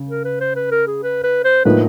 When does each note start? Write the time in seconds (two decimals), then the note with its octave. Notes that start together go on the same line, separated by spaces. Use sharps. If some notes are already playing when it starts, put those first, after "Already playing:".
Already playing: C#3
0.09 A#4
0.25 B4
0.41 C5
0.56 B4
0.71 A#4
0.87 G#4
1.03 B4
1.24 B4
1.44 C5
1.65 A2 F3 A#3 D#4 B4